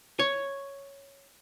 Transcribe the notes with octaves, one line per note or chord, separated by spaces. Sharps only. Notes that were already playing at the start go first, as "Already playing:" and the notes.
C#5